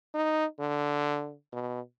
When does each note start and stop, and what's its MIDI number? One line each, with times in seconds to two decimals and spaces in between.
0.14 0.46 63
0.59 1.34 50
1.53 1.80 47